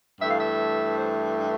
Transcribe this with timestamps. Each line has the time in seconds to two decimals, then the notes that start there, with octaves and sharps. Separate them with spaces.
0.20 G2 E3 A3 E5
0.29 F5
0.38 E5
0.98 C5